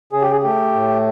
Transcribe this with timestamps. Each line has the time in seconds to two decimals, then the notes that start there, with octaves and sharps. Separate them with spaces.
0.13 C#3 G#4
0.22 G4
0.32 G#4
0.43 A3 G4
0.73 A2